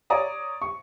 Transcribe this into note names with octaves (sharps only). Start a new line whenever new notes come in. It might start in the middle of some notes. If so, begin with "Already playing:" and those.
C#5 D5 A#5 D#6
C#6